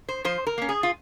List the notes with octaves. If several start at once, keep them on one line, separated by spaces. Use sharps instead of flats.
C5
F3 C5
A#4
A#3 C#4
G#4
F4